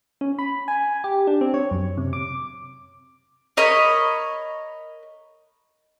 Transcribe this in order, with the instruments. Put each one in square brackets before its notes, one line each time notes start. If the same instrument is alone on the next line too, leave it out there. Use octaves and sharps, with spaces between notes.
[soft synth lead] C#4
B5
G#5
G4
D4
C4
C#5
F#2
C3
D6
[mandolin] A#4 C#5 D#5 B5